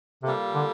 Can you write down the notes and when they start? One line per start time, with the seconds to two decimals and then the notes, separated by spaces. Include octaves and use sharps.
0.23 C3 G3 A#3 F4 A4
0.54 D3